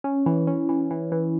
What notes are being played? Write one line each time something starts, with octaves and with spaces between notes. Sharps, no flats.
C#4
E3
C#4
E3
E3
E3